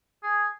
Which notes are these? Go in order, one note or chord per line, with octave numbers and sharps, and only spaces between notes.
G#4